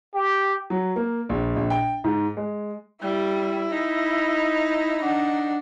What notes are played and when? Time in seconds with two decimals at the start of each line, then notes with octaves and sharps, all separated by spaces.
0.14 G4
0.70 F#3
0.96 A#3
1.29 A#1
1.56 A#1
1.70 G5
2.04 G#2
2.37 G#3
3.02 G3 E4
3.70 D#4
5.01 D4 F#5